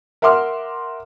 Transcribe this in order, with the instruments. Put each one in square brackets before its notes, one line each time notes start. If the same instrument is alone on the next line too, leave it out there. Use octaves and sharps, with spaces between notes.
[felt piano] A#4 E5 F#5 C6 D6 F6